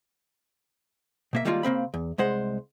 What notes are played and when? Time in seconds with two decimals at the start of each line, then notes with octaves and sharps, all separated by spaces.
1.33 B2 A#3 E5
1.45 D#3 G3 G#3 A#3 C4 F4
1.63 C#3 A#3 C4 B5
1.94 E2
2.18 C2 G#3 C5 F#5